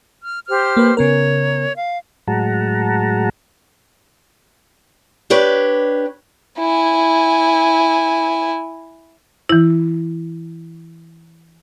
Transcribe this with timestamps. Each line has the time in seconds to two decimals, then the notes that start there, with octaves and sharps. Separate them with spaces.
0.23 F6
0.48 G4 C5 F6
0.77 A#3 B4
0.97 C#3 B3 A#4 C#5
1.75 F5
2.27 A2 F#3 G#3 F#5 A5 A#5
5.30 D4 G4 B4 C#5
6.59 E4 G#5
9.49 E3 E4